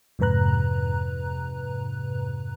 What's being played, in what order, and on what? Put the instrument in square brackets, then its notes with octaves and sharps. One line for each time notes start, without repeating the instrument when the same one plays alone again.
[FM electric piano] F2 G#2 C3 B4 A#5 F#6